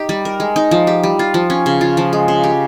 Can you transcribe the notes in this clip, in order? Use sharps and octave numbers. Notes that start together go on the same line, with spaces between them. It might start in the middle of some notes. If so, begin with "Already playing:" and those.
Already playing: D#4 G4
G3
A#4
G#3
D#4
F3
G4
G3
F4
F3
C#4
C#3
F4
F3
G#3
C#3
G4